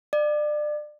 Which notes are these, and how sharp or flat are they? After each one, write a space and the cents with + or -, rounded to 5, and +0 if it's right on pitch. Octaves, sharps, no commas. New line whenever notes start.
D5 +30